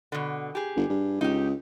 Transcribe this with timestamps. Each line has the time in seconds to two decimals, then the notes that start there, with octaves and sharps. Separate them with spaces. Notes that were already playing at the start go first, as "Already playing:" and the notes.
0.12 B2 D3
0.55 G4 G#4
0.76 G1
0.90 G2
1.21 C#2 D#4 G4